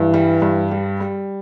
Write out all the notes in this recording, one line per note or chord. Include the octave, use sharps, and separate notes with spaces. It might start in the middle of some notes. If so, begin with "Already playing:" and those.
Already playing: G2 E3
G3
G2
G3
G3